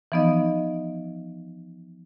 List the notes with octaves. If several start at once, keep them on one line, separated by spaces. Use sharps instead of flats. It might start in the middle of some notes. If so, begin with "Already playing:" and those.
E3 F3 B3 D#4 D#5